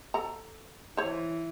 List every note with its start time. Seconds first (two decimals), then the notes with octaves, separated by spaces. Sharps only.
0.14 A4 A#5
0.97 E3 C5 C#5